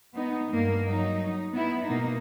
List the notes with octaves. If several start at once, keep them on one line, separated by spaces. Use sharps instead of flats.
B3 D#4
G2 A#3
F#3 D#4
B3 E4
B2 A#3 D#4